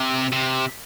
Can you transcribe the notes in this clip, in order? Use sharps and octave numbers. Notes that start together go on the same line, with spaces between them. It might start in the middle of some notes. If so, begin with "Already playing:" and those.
Already playing: C3
C3